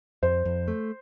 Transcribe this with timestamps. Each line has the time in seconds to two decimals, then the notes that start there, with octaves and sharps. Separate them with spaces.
0.23 F2 C5
0.45 F2
0.68 A3